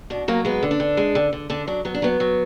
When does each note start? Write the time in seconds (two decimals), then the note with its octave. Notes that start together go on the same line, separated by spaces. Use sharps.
0.10 B2 D4
0.28 F#3 A#3
0.45 G#3 B3
0.63 D3
0.71 D4
0.80 D3
0.97 G#3
1.15 D3
1.33 D3
1.50 D3 D4
1.67 F#3 D4
1.85 F#3 B3
1.95 D4
2.02 F#3 B3
2.20 F#3